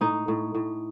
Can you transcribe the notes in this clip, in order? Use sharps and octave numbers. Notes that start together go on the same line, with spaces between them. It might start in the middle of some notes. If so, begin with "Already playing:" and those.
A2 D#4
A2
A2